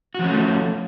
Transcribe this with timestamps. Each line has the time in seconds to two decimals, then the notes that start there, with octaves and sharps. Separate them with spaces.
0.15 F#4
0.19 F3
0.24 C#4
0.28 A3
0.33 F4